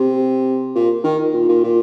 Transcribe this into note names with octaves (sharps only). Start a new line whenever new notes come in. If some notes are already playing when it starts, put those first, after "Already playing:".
Already playing: C3
A#2
D#3
A#2
A#2
A#2